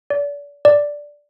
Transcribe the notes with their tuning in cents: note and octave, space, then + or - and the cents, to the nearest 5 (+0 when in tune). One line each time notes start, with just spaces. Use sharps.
D5 -35
D5 -5